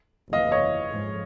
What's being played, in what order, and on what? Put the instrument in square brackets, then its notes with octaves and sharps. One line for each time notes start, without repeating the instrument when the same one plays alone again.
[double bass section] F#1 E2 C3 E3 [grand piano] D#5 F5
[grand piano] C#5 D#5
[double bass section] G#2 F3 G#3